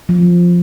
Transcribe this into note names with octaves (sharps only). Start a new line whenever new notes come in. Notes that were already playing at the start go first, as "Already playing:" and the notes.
F3